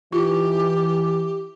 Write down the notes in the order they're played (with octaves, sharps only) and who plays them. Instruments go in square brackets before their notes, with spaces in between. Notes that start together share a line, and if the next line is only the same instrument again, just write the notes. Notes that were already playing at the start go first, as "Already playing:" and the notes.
[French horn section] E3 [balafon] F4 [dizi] G4